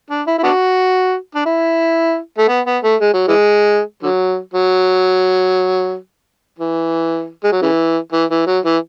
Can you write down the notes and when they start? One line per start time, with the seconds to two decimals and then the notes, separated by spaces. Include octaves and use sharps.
0.10 D4
0.27 E4
0.38 E4
0.43 B3 D4 F#4
1.35 D4
1.46 E4
2.38 A3
2.48 B3
2.66 B3
2.84 A3
3.01 G#3
3.14 F#3
3.28 E3 G#3
4.03 D3 F#3
4.54 F#3
6.59 E3
7.44 G#3
7.52 F#3
7.62 C#3 E3
8.12 E3
8.30 E3
8.47 F#3
8.65 E3